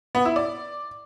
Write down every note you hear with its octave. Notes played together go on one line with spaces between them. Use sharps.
B3
E4
D5